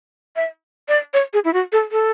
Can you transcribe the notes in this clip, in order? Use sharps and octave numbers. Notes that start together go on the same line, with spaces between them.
E5
D5
C#5
G#4
E4
F#4
A4
A4